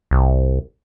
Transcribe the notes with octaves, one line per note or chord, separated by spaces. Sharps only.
C2